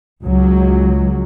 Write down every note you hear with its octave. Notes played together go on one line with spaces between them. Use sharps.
C#2 F#3